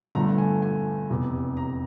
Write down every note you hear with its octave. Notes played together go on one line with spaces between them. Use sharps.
G1 G2 D3 F3 A3 A#5
G#5
G#5
F1 E2 C3
A#5